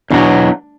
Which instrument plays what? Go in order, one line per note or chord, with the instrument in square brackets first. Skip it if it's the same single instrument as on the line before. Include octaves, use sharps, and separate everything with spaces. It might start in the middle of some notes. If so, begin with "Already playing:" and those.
[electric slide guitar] E2 B2 F#3 [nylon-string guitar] D4